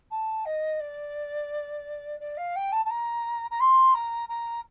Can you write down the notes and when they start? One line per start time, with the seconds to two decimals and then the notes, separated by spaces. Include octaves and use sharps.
0.11 A5
0.45 D#5
0.80 D5
2.20 D5
2.37 F5
2.55 G5
2.72 A5
2.85 A5
2.90 A#5
3.50 A#5
3.60 C6
3.94 A#5
4.29 A#5